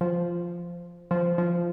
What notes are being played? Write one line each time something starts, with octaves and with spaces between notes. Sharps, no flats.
F3
F3
F3